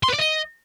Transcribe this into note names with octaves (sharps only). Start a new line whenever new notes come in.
C6
B4
D5
D#5